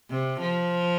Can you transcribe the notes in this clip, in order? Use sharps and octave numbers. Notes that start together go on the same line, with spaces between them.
C3
F3